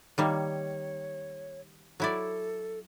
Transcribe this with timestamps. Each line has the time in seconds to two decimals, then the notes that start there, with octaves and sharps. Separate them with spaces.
0.18 D#3 G3 A#3 C#5
2.00 F#3 E4 A4 D5